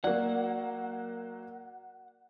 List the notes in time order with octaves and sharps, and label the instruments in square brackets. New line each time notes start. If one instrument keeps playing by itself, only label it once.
[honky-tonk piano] F#3 A#3 [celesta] D5 [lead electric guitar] F#5